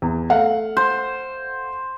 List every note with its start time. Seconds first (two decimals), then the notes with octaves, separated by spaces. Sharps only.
0.02 E2
0.30 A3 F5 F#5
0.77 C5